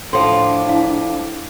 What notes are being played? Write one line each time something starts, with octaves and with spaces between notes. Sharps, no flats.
A2 F3 D4 C6
E4 F5